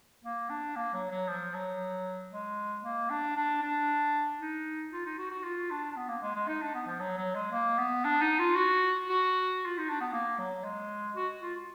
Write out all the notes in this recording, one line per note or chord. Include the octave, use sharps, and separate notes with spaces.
A#3
D4
A#3
F#3
F#3
F3
F#3
G#3
A#3
D4
D4
D4
D#4
F4
D#4
F#4
F#4
F4
D4
D4
B3
A#3
G#3
G#3
D#4
D4
B3
F3
F#3
F#3
G#3
A#3
B3
D4
D#4
F4
F#4
F#4
F4
D#4
D4
B3
A#3
F#3
G#3
F#4
F4